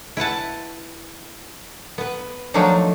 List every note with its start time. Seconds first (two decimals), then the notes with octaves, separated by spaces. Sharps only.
0.17 E4 B4 F#5 A5
1.98 B3 B4
2.54 D#3 F3 F#3 A3 D4 D#4